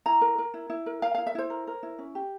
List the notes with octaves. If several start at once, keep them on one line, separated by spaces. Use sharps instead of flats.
E4 A#5
A#4
A#4
E4
E4
A#4
A#4 F5
E4 F5
E5
E4 C5
A#4
A#4
E4
C#4
G4